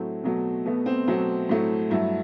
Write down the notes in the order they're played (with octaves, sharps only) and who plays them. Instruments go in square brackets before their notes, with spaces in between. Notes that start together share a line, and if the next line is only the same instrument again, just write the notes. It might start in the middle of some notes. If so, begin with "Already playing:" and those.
Already playing: [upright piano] A2 F#3 A3 C4
B2 F#3 A3
B2 A3 B3
C4
B2 F#3 A3 C4
A2 F#3 A3
G2 F#3 A3 E4